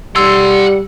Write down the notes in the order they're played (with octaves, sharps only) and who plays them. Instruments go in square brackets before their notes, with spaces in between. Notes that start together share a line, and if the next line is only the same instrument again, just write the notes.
[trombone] G3 [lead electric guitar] F#5 C6 [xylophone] E6